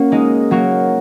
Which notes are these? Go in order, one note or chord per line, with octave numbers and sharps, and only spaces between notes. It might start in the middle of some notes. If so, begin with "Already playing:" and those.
Already playing: A#3 C#4 F#4
G#3 D#4 A#4
F#3 A#3 F#4 A#4